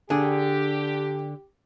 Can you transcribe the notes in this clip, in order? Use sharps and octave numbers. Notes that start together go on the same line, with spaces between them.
D3 D4 G4 G#4